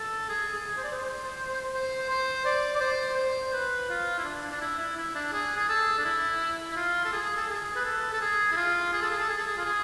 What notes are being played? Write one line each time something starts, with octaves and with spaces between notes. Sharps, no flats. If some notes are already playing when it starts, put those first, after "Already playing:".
Already playing: A4
G#4
G#4
C5
D5
C5
C5
C5
D5
D5
C5
C5
B4
F4
E4
D4
D4
E4
E4
E4
D4
G#4
G#4
A4
D4
E4
E4
F4
A4
G#4
A4
G#4
B4
A4
A4
G#4
E4
F4
G#4
A4
G#4
A4
G#4
A4
G#4
F4
G#4